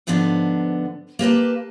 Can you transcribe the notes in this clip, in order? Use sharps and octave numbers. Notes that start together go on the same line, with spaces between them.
G#2 D3 F3 B3 D4
A#3 G4 B4 A5